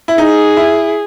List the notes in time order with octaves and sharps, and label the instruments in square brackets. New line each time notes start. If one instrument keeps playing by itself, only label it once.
[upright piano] E4
[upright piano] D#4 [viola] G#4
[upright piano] E4